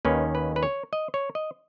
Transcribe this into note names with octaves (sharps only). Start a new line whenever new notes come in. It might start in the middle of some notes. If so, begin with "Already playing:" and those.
D#2 D#3 A#3 C#4 B4
B4
B4
C#5
D#5
C#5
D#5